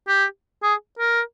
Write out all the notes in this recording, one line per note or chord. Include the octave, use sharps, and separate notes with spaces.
G4
G#4
A#4